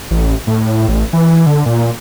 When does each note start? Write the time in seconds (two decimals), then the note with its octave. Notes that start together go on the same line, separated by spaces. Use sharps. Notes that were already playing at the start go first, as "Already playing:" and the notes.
0.11 A1
0.47 A2
0.88 A1
1.13 E3
1.46 D3
1.66 A#2